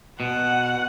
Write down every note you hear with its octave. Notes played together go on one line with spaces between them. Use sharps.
B2 F#5